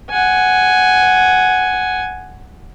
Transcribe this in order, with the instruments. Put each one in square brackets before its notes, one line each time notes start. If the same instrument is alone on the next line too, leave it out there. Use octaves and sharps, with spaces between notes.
[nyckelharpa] F#5 G#5